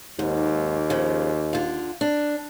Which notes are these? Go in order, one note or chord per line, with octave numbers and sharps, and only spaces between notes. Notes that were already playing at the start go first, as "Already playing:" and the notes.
D#2 G#2
C#3 F3
D3 F4
D4